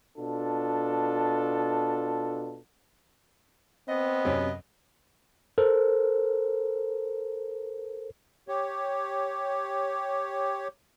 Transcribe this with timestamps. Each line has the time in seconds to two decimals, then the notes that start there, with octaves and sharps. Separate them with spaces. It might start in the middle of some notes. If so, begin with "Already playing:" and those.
0.18 B2 D4 F4 A4
3.88 B3 C4 D#5
4.25 F#2 C3 F#3
5.58 A4 A#4 C5
8.48 G4 C#5